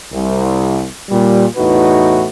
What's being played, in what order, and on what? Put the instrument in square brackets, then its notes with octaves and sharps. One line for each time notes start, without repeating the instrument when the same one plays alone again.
[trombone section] C2
A#2 G3
E2 A2 D#4 F#4 B4